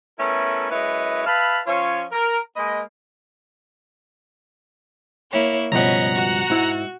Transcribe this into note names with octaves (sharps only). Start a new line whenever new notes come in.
A3 B3 C#4 E4 A4 A#4
F#2 G#3 E4 B4 C#5 D#5
B4 E5 F5 A5 B5
F3 C#4 F4 C#5
A#4
G#3 A#3 B4 D#5
A#3 E4 C#5
C#2 G2 B2 F3 C#4 D#5 F#5 A#5
F#4
G#2 E4